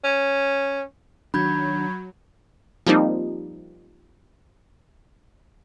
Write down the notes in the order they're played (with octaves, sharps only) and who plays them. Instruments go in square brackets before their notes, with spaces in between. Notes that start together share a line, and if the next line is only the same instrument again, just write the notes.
[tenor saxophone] C#4
[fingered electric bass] D#3 D4 [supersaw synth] F#3 [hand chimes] B5 G6 G#6
[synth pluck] F3 G3 A#3 C4 D#4